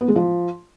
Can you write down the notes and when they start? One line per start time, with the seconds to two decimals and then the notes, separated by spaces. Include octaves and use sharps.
0.01 B3
0.08 G#3
0.16 F3